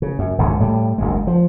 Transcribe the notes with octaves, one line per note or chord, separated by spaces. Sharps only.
C#3
F#2
G#1 C#2 G#2 D3
A2 G3
F#1 D2 G#3
F3